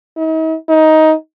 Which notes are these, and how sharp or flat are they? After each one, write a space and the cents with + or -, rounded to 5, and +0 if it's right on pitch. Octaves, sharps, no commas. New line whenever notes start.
D#4 +45
D#4 +15